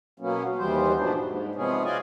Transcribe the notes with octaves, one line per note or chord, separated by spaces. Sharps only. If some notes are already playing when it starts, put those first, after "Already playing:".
B2 F#3 A#3 B3 C#4
D#2 E3 G3 B3 C5
G#2 B2 F3 F#3 B3 D4
G#2
C3 F3 G#3 B3 C#4 G#4
F4 F#4 D5 D#5 G#5